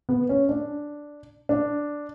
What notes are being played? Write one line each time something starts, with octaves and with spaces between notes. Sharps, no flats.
B3
C#4
D4
D4